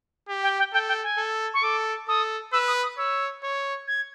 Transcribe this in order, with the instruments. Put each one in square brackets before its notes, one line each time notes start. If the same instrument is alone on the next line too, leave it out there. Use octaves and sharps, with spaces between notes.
[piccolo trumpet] G4
[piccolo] G5
G5
[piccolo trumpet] A4 [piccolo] G5
[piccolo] G5
G#5
[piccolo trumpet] A4
[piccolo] C#6
[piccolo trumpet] A4 [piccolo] D6
[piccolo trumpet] A4 [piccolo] D#6
[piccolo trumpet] B4 [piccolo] E6
[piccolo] D#6
D#6
[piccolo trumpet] C#5 [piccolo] E6
[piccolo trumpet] C#5
[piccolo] G#6